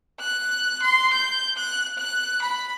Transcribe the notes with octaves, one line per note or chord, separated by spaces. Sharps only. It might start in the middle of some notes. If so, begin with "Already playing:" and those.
F#6
C6
G6
F#6
F#6
B5